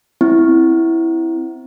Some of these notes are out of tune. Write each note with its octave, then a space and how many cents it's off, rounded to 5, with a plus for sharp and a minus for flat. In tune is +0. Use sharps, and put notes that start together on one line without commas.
C4 +0 E4 +0